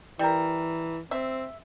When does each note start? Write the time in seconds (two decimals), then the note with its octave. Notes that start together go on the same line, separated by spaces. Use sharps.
0.19 E3 G3 A#4
1.11 C4 E5